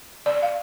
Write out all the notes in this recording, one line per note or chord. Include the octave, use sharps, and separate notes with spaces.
D5
F5